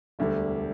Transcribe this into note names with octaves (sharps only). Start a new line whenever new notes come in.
E1 D2 D3 G3